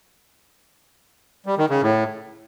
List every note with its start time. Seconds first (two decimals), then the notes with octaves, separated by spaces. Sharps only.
1.46 G3
1.58 D#3
1.70 C#3
1.82 A2